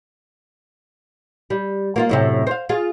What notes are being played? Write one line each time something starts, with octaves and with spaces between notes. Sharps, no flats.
G3
A#3 F4 F5
F#2 A2 C3
C5 F5
F4 G#4